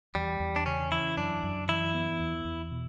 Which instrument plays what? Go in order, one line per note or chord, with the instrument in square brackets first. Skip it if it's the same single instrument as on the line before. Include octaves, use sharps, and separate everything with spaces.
[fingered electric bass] E2 [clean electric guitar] G3
[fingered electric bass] E2
[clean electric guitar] D4
[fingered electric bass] C#3 [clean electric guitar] C#4
[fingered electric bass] E3 [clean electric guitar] E4
[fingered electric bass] F#2 [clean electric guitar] D4
[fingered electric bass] F#2
[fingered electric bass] E3 [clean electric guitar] E4
[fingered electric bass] B3
E2
E2
B2